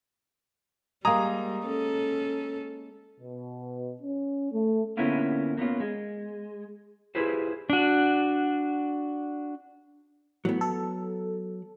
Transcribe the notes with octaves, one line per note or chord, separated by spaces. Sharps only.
G3 G#3 A#3 A#5 D#6
C#4 A4
B2
C#4
A3
D3 A#3 B3 C#4 E4 F4
A#3 B3 C#4 F4
G#3
E4 F4 G4 G#4 B4 C5
D4 F#4
A2 F#3 B3
A4